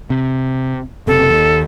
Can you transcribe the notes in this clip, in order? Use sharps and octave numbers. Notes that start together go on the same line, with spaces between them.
C3
F#1 C3 A4
D#2